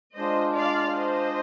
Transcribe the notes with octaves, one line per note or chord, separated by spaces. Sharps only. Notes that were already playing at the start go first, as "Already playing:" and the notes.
G#3 D4 F4 C5 D#5
D5 F5
C5 D#5